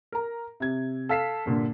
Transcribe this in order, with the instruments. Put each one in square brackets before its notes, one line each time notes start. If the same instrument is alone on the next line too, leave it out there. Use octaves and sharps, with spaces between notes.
[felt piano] A#4 A#5
C3 G#6
A4 F5 B6 C7 E7
G2 A#2 D3